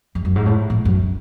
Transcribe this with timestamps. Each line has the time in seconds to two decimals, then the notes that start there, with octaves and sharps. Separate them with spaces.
0.15 F2
0.25 F#2
0.36 G#2
0.46 A2
0.70 A2
0.85 F#2